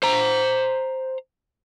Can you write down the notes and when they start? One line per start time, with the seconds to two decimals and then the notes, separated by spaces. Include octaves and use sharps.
0.03 C5 A#5